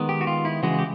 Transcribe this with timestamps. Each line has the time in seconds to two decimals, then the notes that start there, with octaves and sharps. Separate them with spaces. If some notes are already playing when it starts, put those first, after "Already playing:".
Already playing: D#3 G#3 B3
0.09 G4
0.21 F#4
0.27 F4
0.45 E4
0.63 C#3 E3 G#3 F#4
0.79 G4